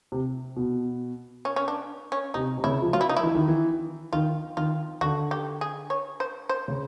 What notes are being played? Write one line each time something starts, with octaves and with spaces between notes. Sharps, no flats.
C3
B2
C#4
C#4
D4
C#4
C3 D#4
C3
C#3 E4
F3
F#3 F4
E4
D#4
E4
E3
D#3
E3
D#3 F4
D#3 F4
D3 F#4
G4
G#4
C#5
C5
C5
C#3